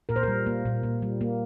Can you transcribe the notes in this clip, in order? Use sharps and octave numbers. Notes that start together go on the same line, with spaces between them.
A#2 A#4
C5
G3 A#4
A#3
A#2
A#2
G3
A#3